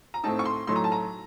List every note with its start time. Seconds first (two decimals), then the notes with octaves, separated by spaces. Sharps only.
0.14 A#5
0.24 A2 A3 C4 D#4 A5
0.39 C#6
0.45 C6
0.67 A2 F#3 A3 D#4 C6
0.76 A#5
0.84 A5
0.92 A#5